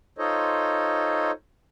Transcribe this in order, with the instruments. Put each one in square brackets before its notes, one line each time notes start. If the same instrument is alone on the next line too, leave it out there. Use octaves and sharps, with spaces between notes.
[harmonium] D#4 F4 A4 C5 C#5 D#5